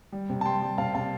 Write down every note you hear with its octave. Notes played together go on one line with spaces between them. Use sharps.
G3
C3
A5
G3 G5 C6
G3
C3 F5 A5
C3 F5 A5